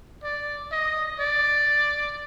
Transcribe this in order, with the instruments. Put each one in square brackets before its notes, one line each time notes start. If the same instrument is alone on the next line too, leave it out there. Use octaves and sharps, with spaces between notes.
[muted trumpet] D5
D#5
D5